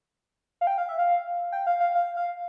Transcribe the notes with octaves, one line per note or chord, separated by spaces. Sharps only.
F5
G5
F5
E5
F5
G5
F5
F5
F5
F5